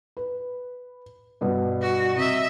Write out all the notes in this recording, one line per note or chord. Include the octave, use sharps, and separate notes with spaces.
B4
G2 B2
F#4
C3 D#5 E5